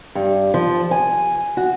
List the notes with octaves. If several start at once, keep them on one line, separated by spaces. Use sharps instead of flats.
G2
F3
G#5
F#4